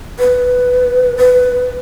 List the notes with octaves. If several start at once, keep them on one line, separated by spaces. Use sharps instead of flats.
B4
B4